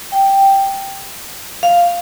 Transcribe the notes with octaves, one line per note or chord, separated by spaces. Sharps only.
G5
F5